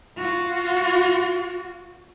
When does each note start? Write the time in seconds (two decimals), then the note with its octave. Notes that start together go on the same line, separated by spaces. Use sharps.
0.17 F4 F#4